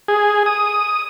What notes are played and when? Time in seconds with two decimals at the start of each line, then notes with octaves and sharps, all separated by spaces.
0.08 G#4
0.46 D#6